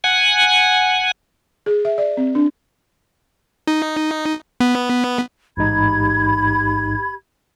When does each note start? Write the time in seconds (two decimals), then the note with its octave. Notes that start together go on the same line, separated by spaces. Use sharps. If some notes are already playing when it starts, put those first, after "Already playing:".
0.04 F#5 G#5
1.66 G#4
1.85 E5
1.98 D5
2.17 C4
2.35 D4
3.67 D#4
4.60 B3
5.57 A1 G#2 D#4 G4 B5 G#6